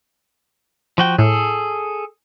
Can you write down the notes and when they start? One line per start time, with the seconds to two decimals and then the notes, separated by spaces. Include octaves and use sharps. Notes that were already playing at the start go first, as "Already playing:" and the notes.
0.98 F3 F#4 G5
1.18 A2 G#4 A4